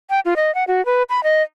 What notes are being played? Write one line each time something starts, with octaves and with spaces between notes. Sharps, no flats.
G5
F4
D#5
F#5
F#4
B4
B5
D#5